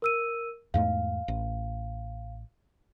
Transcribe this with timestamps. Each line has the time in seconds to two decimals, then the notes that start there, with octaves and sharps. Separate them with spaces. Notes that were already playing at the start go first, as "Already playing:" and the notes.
0.02 A#4 E6 D#7
0.74 E2 G#2 A3 F5
1.28 A1